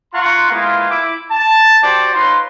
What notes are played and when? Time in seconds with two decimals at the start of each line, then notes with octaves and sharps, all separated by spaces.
0.14 F4 F5 F#5 A#5 C6 C#6
0.50 G#3 A#3 B3 E4 F4
0.90 E4 D6
1.31 A5
1.82 F#4 G4 C5 D5
2.14 D#4 F4 B4 C#5 C6